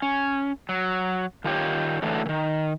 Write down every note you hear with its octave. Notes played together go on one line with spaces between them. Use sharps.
C#4
F#3
D#3 F4 G4 C#5
D3 E3 F#3 A3
D#3 E3